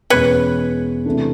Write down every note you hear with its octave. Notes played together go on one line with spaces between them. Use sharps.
E2 B2 G#3 C#4 B4 C#5
C3 E3 A3 D4